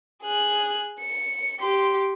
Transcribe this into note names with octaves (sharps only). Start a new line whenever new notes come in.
G#4 F#6
C#7
G4 C6